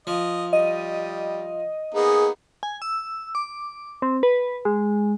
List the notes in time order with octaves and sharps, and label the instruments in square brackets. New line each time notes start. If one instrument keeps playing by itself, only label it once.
[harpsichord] F3 [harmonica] D#5
[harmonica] G3 [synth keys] D#5
[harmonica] A#3 B3 D#4 [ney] G#4
[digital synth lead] G#5
E6
D6
C4
B4
G#3